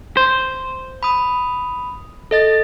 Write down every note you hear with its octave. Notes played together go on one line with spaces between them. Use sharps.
C5
B5 D#6
A4 D#5 A6